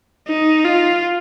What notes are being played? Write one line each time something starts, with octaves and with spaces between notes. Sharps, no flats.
D#4
F4